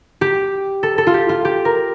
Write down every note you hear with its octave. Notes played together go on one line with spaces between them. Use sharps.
G4
A4
A4
F4
G4
F4
G4
A#4